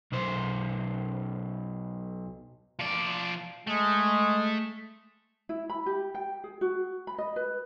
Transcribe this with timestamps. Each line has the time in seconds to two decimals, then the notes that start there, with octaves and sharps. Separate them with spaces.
0.12 B1 C5
2.79 F3 D5
3.67 G#3 A3
5.49 E4
5.69 B5
5.86 G4
6.14 G5
6.44 G#4
6.61 F#4
7.07 B5
7.18 D#5
7.36 B4